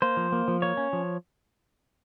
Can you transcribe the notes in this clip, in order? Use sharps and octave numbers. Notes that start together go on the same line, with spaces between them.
A#3 C5
F3
A#3
F3
A#3 C#5
C#4
F3